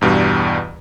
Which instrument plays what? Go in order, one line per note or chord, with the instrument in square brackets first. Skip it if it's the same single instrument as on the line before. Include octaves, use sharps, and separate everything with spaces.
[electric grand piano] E2 G2 B2 G3